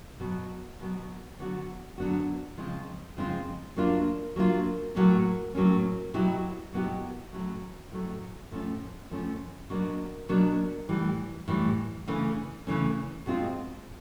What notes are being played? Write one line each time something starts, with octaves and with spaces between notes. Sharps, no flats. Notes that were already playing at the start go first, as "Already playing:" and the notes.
B2 F#3 B3
B2 F#3 B3
D3 F#3 B3 D4 F#4
D3 F#3 B3 D4 F#4
C#3 F3 G#3 C4 F4
C#3 F3 G#3 C4 F4
F#3 A#3 D4 F4
F#3 A#3 D4 F4
A2 F#3 A#3 C#4
A2 F#3 A#3 C#4
B2 F#3 B3 E4 G4
B2 F#3 B3 E4 G4
A2 F#3 A3 C#4
A2 F#3 A3 C#4
A2 F3 A3 C#4
A2 F3 A3 C#4
B2 F#3 A#3 D4
B2 F#3 A#3 D4
A2 E3 G3
A2 E3 G3
C#3 E3 A3 C#4
C#3 E3 A3 C#4
B2 G#3 C4 F4